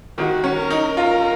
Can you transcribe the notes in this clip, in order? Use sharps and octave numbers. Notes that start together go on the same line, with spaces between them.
D#3 F#4
C#4
A#4
D#4
F4